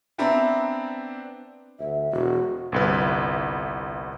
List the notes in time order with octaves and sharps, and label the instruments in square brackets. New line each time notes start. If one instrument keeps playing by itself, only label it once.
[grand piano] B3 C4 D4 B4 E5 A#5
[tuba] D2 [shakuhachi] E5
[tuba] E1 [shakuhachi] F#4
[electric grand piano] G1 C2 B4